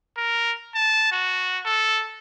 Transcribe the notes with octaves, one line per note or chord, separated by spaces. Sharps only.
A#4
A5
F#4
A4